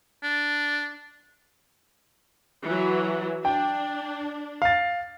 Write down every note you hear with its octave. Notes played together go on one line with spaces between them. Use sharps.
D4
E3 F#3
D4 G5
F5 A6